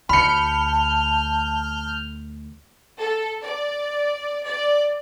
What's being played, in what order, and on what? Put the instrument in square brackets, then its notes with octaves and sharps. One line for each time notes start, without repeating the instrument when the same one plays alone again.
[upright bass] D2 [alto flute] A5 [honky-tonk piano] B5 C#7 [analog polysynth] F6 G6
[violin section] A4
D5
D5